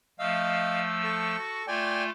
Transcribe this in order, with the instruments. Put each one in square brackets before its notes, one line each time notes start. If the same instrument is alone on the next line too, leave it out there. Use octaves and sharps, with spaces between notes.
[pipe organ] F3 A3 E6 [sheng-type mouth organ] D#5 F5
[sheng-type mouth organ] A4 C#6
[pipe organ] F#4
[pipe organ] A3 F4 [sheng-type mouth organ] D5 G5 G#5